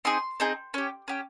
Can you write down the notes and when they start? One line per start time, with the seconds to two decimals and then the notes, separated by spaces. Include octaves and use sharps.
0.05 C4 D#4 G#4 C6
0.40 C4 D#4 G#4
0.74 C#4 G4
1.08 C#4 G4